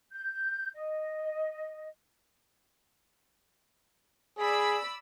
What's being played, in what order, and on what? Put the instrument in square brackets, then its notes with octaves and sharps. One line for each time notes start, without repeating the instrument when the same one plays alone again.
[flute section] G6
D#5
[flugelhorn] G#4 [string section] D5 B5 E6